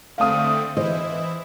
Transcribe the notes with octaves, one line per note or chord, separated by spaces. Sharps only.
D3 A3 C4 F5 D#6
E3 E4 C5 D#5